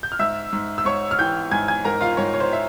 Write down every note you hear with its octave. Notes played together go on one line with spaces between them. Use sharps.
G6
F6
G#2 E5 E6
G#2
E6
G#2 C#5 C#6
F6
E3 G5 G6
G#2 G#5 G#6
G#5 G#6
G#2 A#4 A#5
F4 F5
G#2 C#5
C#5
C5
E5